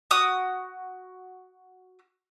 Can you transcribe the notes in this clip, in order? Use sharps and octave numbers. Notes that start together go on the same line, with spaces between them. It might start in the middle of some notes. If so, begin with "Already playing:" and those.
F#4 D#6